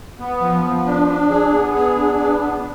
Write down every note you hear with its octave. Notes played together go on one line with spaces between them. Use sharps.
B3
F3
F3
D4
D4
G#4
B3
G#4
D4
B3
B3